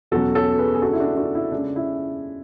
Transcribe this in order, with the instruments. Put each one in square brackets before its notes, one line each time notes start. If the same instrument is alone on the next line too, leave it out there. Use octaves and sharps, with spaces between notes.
[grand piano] E2 B2 F#3 C#4 F#4 A4
A4 C#5
G#4 B4
G#4
C#3 G#3 D4 F#4 A4
E4
D4 F#4
D4 F#4
E4
C#3 G#3 C#4 D4
E4